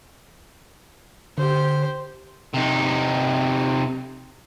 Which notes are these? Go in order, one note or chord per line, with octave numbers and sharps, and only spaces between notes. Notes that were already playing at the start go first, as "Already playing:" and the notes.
D3 G4 C5
C3 D#4